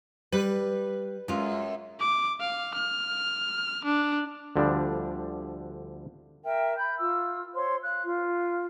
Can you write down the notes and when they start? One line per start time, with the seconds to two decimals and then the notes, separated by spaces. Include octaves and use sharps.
0.32 G3 B4
1.28 F#2 G#3 F4
2.00 D6
2.40 F5
2.74 F6
3.85 D4
4.56 D2 D3 F3 G3 D4
6.43 A#4 E5 G5
6.77 B5 G6
6.98 F4 E6
7.54 C5 C#5 C6
7.83 F5 F#6
8.03 F4